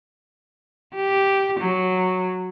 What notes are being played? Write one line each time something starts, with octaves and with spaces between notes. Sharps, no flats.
G4
F#3